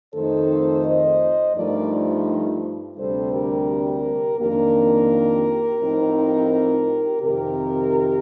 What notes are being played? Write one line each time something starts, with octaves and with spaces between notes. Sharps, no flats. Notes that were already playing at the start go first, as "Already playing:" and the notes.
F2 D#3 A3 D#4 A4 C5
C5 D#5
G2 F3 A3 D#4 A#4 D5
D2 C3 G3 D4 A4 C5
G4 A#4
F2 D#3 A#3 D4 G4 A#4
A2 F3 C4 D#4
F2 C3 D#3 G4 A#4